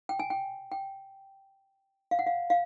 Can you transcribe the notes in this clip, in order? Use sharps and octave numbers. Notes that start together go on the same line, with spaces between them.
G5
G#5
G5
G5
F5
F#5
F5
F5